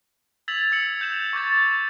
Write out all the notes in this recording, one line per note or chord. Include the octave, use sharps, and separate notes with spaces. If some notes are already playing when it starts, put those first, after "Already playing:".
E6 G#6 A6 B6 F7 F#7
E6 C#7 F#7
G6 E7 F7
C#6 D6 G6 A6